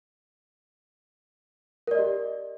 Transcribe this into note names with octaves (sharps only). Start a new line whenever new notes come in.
G4 A#4 D5 D#5